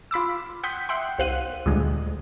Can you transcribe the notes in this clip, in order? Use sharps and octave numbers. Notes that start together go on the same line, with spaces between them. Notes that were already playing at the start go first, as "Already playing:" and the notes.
F4 B5 D6 E6
F#5 G5 C6 D#6 G6 B6
E5 F#5 G5 C6
C2 C5 F5 F#5 F#6 D#7
D2 A#2 D3 G3 G#3